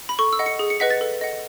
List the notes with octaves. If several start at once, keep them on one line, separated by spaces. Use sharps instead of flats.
B5
A4 C#6
E6
D#5 F#5
C#7
G#4
C#7
B4 D#5 F#5 B6
A6
A4
D#5 F#5